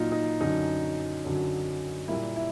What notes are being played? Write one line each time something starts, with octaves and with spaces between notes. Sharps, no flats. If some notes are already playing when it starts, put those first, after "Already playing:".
Already playing: A#2 F#3 A#3 D#4 F4
D#4
F#2 D3 F#3 D#4
F#2 D3 F#3
A#2 G3 A#3 E4
E4